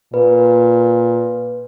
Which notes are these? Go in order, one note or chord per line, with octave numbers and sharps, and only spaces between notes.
A#2 B4